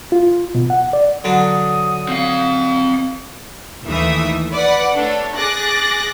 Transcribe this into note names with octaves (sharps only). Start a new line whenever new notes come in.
F4
B2
F#5
D5
D3 F#3 D4 D#6
C4 F5
D#2 D#3 E3 A3 E5 D#6
B4 D5 F#5
A3 D4 A4 C#5
G#4 D6 F#6 A6 A#6